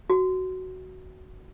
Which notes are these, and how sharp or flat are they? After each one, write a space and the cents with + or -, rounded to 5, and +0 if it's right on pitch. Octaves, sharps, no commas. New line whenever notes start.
F#4 +10